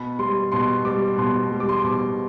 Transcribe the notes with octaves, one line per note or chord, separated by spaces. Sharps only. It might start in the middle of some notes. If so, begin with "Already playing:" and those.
Already playing: B2 B5
G3 C6
B2 C6
G3 D6
B2 C6
G3
D6
C6
D6
B2